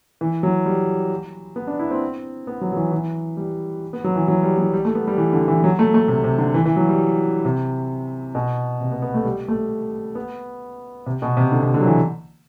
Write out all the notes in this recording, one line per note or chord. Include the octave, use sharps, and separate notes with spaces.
E3
F#3
G3
B3
D4
E4
C4
B3
F#3
F#3
E3
E3
G3
B3
F#3
E3
F#3
G3
F#3
G3
A3
B3
G3
E3
D3
E3
F#3
A3
A3
C3
C3
D3
E3
E3
F#3
G3
C3
B2
C3
B3
B3
A3
G3
A3
B3
C3
B2
C3
D3
C3
D3
F#3
E3